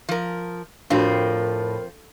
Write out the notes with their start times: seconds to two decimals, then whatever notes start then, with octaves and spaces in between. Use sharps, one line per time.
0.09 F3 A#4
0.90 F2 A2 C4 D4 F4 F#4 A#4